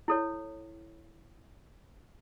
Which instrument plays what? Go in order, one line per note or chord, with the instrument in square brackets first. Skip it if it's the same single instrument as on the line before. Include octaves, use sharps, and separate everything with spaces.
[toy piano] E4 A4 C#5